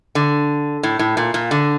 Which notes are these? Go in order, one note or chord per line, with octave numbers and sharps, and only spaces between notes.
D3
A2
A2
A#2
A#2
D3